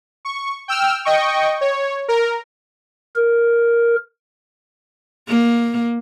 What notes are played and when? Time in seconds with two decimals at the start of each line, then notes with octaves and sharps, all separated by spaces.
0.25 C#6
0.68 G5 E6 F6
1.05 D#5 G5 C#6
1.61 C#5
2.08 A#4
3.16 A#4
5.28 A#3